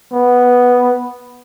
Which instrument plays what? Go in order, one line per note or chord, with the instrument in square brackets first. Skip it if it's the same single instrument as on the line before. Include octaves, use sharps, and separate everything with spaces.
[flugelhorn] B3